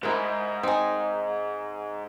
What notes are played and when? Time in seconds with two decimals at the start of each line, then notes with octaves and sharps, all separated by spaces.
0.03 G#2 E4 A#4
0.63 C4 D#4 G#4